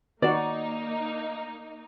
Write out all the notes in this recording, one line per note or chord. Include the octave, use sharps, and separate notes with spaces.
D#3 A#3 D#4 F#4 D5